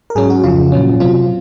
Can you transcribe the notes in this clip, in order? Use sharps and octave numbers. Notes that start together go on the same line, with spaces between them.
A#4
G#2 F#3 C#4 G#4
F#4
F2 C#3 F3 F4
A#2 F#3 C#4
C3 F#3 C4 F4